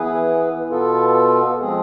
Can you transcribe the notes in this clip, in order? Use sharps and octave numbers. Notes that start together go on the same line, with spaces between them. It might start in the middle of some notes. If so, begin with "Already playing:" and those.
Already playing: E3 B3 E4 G#4 B4
B2 B3 F4 A4
F3 G#3 C4 G#4